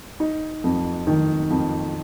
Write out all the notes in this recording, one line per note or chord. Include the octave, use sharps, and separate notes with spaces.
D#4
F2
D#3
F2